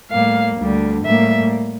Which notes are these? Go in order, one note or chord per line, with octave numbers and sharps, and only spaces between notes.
A2 G3 A#3 F5
D2 D3 G3
A2 G3 A#3 E5